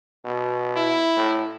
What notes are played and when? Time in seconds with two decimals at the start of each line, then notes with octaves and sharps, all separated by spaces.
0.25 B2
0.76 E4
1.17 A2